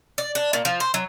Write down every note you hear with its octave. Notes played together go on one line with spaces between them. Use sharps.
D5
D4
A#2
F3
C5
F#3